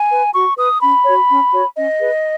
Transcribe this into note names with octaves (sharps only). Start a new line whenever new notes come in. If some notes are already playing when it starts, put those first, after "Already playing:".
Already playing: G#5
B4
F#4 C#6
B4 D#6
C#4 B5
F#4 C#5
C#4
F#4 C#5
C#4 D#5
G#4 B4